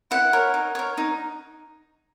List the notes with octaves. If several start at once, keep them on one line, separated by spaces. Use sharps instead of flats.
E4 F#5
A#4 C#5
D#4
A#4 C#5
D#4